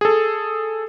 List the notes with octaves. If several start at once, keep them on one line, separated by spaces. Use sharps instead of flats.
G#4 A4